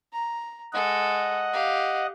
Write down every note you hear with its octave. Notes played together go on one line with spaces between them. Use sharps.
A#5
G#3 A4 D#5 F#5
G4 F5